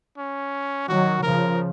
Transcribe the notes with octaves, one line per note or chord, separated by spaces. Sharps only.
C#4
D#3 F#3 F#4
C#3 F3 A#4